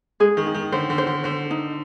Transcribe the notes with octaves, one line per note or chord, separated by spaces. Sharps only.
G#3 G#4
D#3
D#4
D#3
D3 C5
D3
C5
D3
D3 C5
D#4